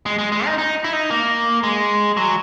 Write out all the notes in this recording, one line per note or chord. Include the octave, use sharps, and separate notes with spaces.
G#3
G#3
G#3
D#4
D#4
E4
D#4
A#3
G#3
F#3